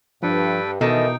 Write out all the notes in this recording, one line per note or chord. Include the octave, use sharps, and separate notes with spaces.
G2 F3 D4 A4 B4 G5
B2 D#3 E3 D#4 A4 A#4 D#5 G5